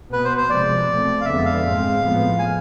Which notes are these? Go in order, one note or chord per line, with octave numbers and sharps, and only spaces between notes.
B2 B3 B4
C5
C5
C3 F3 G#3 D5
B2 A3 C4
F5
F2 D3 G#3 B3 E5
F5
G#2 G#3 C4
A2 F3 G#3 B3
G#5